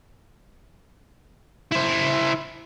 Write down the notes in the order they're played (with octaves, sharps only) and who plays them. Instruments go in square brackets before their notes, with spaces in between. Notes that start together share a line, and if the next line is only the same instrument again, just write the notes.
[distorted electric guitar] E4 C5